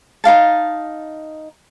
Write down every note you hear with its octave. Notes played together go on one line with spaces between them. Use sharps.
D#4 E4 F5 A5